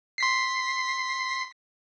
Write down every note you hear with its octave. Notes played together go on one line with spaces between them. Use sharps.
C6 B6 C7